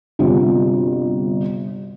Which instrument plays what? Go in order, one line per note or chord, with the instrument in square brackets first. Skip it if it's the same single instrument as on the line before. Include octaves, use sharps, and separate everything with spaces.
[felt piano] G1 C3 F4 F#4